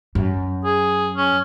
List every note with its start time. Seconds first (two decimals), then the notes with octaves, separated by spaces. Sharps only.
0.15 F#2
0.65 G#4
1.17 C#4